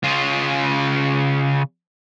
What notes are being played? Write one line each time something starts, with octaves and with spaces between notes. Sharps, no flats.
C#3 F4